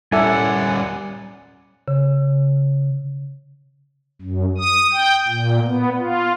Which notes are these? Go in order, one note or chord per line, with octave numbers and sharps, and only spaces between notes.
G3 C#4 E4 A4 D5 E5 F#5 G#5
C#3
F#2
D#6
G5
A#2
B3
F4